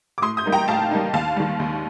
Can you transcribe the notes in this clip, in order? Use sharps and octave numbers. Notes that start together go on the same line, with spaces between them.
D6
A2 C6 D#6
D#6 G6
G3 A#3 D#4
G5 A#5
A2 F5 A5
G3 A#3 D#4
D#2 F5 A5
D#3 G3
D#2